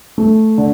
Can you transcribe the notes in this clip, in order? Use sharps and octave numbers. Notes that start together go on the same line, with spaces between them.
A3
D3